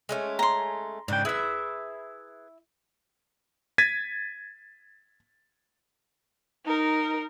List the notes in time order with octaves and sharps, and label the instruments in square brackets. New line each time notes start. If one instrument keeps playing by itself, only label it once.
[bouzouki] G#3 A3 C#4
[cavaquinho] A#5 C6
[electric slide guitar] G#2 C#3 G5 [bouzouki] D4
[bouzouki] E4 E5 [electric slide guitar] G#4 B4
[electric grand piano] G#6 A6 B6 D#7
[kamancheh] D#4 A#4